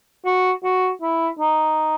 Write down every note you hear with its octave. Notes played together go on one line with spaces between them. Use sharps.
F#4
F#4
E4
D#4